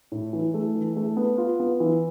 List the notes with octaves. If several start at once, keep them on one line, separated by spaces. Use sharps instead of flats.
A2
E3
A3
E3
A3
B3
F4
B3
E3